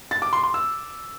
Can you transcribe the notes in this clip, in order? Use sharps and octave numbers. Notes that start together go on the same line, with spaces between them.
A6
D6
C6
C6
E6